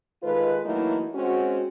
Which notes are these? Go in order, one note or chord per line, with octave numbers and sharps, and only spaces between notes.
D#3 G#3 F4 A4 B4
E3 F#3 A3 A#3 D#4 E4
G#3 C4 C#4 F#4